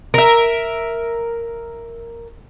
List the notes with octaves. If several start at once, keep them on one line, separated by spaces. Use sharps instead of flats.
A#4 E5